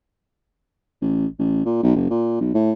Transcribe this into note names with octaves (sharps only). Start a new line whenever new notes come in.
A1
A1
A#2
B1
F#1
A#2
B1
A2